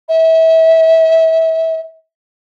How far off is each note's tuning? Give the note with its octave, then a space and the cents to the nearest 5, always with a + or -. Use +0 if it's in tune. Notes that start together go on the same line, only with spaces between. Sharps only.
E5 -30